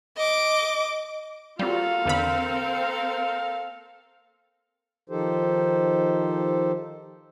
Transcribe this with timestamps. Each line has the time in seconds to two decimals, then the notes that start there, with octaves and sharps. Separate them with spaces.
0.17 D#5 D6
1.59 G3 A#3 C4 F4 F#4 A4 F5
2.05 E2 D3 C4 A#4 B5
5.10 D#3 F3 D#4 G4 A4 C5